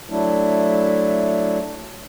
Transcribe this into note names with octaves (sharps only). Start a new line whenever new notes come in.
F#3 A3 D4 E4